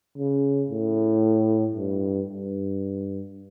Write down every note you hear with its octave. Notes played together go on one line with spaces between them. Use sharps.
C#3
A2
G2
G2